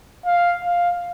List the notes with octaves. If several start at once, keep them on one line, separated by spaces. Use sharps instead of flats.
F5
F5